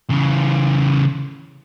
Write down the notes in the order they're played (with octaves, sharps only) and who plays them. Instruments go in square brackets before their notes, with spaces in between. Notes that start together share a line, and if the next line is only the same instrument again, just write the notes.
[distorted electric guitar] C#3 E3